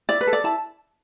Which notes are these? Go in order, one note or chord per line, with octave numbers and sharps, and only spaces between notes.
E4 D5
B4
A4
D5
E4 A5